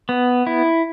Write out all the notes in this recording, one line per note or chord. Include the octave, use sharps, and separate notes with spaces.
B3
E4